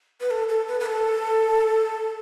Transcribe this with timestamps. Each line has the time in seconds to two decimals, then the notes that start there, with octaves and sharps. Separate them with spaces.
0.21 B4
0.31 A4
0.49 A4
0.68 B4
0.80 B4
0.86 A4